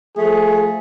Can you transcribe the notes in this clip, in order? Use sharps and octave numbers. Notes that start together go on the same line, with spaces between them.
F3 A3 G#4